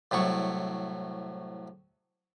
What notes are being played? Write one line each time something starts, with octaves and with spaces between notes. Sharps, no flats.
C2 A2 F#3 C#6